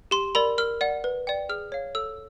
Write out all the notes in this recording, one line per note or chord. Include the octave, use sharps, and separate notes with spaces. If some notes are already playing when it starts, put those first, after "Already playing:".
G4 C6
A#4 D5 B5
A#4 F6
D5 F#5
B4
D5 G5
G#4 F6
C#5 F5
A4 E6